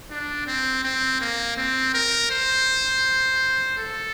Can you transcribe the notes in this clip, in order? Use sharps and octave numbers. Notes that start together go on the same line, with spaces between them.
D4
C4
C4
A#3
C4
A#4
C5
A4